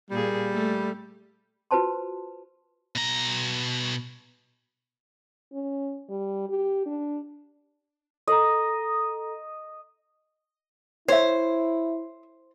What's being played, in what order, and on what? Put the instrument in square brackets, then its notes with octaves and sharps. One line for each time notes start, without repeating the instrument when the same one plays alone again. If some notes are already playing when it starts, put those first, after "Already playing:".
[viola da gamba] A#2 A#3 G#4 [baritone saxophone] G3
[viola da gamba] A3
[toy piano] F4 F#4 B4 C5 A5 C6
[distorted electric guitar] B2 A#5
[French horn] C#4
G3
G4
D4
[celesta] A4 A#5 [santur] D#5
[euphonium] E4 [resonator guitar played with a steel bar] C5 [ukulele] C#5 E5